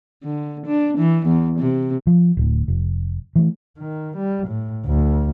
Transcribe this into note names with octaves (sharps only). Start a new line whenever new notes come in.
D3
D4
E3
E2
C3
F3
D1 D2
F1
E3 A3
D#3
G3
A2
D2